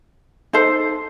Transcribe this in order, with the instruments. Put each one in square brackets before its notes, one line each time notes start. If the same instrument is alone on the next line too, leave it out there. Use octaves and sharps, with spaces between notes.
[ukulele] D#4 A4 C5